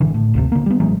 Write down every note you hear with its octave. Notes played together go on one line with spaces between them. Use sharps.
G#1 D3 E3
A2
G#1 D2 C3
D3 A#3
G3 B3
A1 E3 F#3 G#3